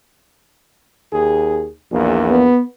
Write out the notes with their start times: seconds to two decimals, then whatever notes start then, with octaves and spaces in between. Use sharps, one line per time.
1.12 D#2 G#4
1.91 A#1 E2 A#2
2.29 B3